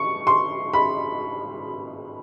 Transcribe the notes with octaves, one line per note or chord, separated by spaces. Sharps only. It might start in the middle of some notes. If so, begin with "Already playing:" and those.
Already playing: C#6
C6
B5